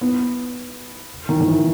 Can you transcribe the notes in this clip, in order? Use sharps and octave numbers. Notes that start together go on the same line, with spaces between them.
B3
D#3
D#3
E3